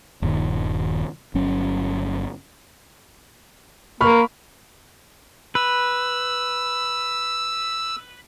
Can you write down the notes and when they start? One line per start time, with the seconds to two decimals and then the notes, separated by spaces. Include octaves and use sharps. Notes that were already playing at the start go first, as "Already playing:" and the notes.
0.22 D#1 G2 D#3
1.34 G1 F#3 C#4
4.01 A#3 B5 C#6 F6
5.55 B4 E6